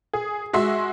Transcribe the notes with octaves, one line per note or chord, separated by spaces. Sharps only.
G#4
G#3 F#4 E5 C6